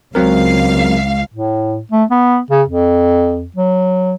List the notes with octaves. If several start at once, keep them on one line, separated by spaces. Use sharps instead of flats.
C#2 F#3 C4 A#4 F5
A2
A3
B3
C#3
F2
F#3